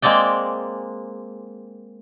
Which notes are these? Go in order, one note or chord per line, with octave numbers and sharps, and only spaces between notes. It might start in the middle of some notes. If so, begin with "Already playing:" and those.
G#3 A#3 C4 D5 G5